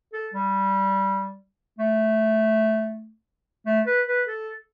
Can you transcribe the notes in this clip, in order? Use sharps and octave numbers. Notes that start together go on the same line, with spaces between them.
A4
G3
A3
A3
B4
B4
A4